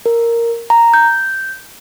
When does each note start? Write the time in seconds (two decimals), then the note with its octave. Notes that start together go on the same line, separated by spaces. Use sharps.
0.06 A#4
0.70 A#5
0.94 G6